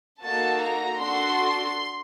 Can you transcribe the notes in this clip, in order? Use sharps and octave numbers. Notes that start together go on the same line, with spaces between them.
A#3 D#4 F#4 A4 A5
A#5
D4 F#4 A4 C6